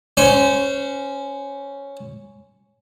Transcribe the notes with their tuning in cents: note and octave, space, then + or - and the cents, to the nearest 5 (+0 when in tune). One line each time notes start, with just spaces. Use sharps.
C#4 +0 C5 -20